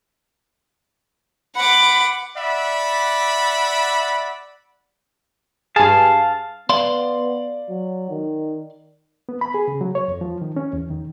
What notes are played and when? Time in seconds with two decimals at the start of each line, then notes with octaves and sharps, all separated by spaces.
1.55 F#5 B5 D6
2.37 D5 E5 F#5 B5
5.76 G2 G#4 F5 A5
6.69 B3 D5 F5 C6
7.69 F#3
8.10 D#3
9.29 B3
9.41 B5
9.54 G#4
9.68 C#3
9.81 F#3
9.95 C#5
10.08 F2
10.21 F3
10.42 D#3
10.56 C#4
10.73 E2
10.90 D#3